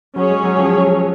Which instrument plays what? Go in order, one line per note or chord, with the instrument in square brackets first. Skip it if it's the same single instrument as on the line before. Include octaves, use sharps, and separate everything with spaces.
[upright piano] F#3 [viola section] C#4 G#4 C#5
[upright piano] G#3
F#3
F3